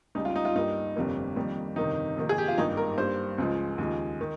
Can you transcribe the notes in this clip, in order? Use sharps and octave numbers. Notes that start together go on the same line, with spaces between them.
C#2 C#3 G3 D#4
F4
D#4
F4
G2 G3 A#3 D#4
G1 F2 C3 G3 A#3
F2 D#3 G3 A#3
G1 F2 C3 D#3 D#4
F2 C3 D#3 A#3
G#4
G4
F4
G#1 G2 G3 A#3 D#4
A#4
G2 G3 A#3 C5
C#2 C#3 F3 G#3
D#2 C#3 F3 G#3
D#3